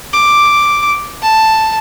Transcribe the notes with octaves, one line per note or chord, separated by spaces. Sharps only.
D6
A5